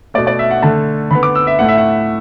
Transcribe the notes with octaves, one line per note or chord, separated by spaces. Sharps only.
B2 A3 D5
D5
E5
F#5
D3 A3 A5
D3 B3 B5
D6
E6
E5
A2 A3 F#5
E5
F#5